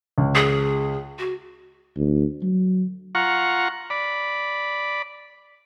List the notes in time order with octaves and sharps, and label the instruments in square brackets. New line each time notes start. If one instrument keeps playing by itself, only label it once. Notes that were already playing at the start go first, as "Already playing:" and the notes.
[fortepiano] C#2
[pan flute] G#4
F#4
[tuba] D2
F#3
[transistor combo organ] F4 F#5 A#5 C#6
D5 B5